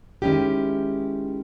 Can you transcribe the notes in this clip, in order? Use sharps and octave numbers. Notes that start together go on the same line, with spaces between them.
D#3 G#3 C#4 E4 G4